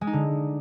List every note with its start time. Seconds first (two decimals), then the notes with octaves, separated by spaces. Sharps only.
0.01 G#3
0.07 D#4
0.13 D3